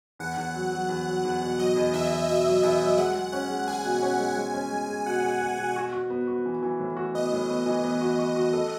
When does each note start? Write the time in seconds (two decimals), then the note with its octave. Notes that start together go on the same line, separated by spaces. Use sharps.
0.19 E2 F#5
0.37 E2
0.54 F#3
0.72 F#3
0.89 E2
1.07 F#3
1.24 E2
1.41 B2
1.59 F#3 D#5
1.76 E2
1.93 E2 E5
2.10 E2
2.28 B2 E5
2.46 F#3
2.63 E2 E5
2.81 F#3
2.97 G#3 F#5
3.14 G#3
3.32 C#4 F#5
3.50 G#3
3.67 G#4 G#5
3.84 B2
4.02 C#4
4.19 G#3
4.36 G#3
4.54 C#4
4.71 G#3
4.88 G#4
5.06 B2 F#5
5.24 G#4
5.40 G#4
5.58 B2
5.76 F#4
5.93 F#4
6.10 B3
6.27 F#4
6.46 E3
6.62 E3
6.80 A2
6.97 F#4
7.14 B3 D#5
7.32 A2
7.50 B3
7.66 E3
7.83 B3
8.01 F#4
8.19 F#4
8.36 F#4
8.53 A4